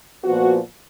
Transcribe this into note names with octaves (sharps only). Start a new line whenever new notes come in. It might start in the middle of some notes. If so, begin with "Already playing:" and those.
A#2 F3 B3 F#4